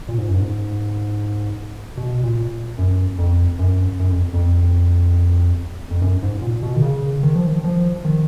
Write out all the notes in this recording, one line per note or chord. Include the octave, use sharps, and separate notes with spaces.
A#2
G#2
F#2
G#2
B2
A#2
F#2
F2
F#2
F#2
F2
F2
F2
F#2
G#2
A#2
B2
D#3
C#3
D#3
F3
D#3
F3
D#3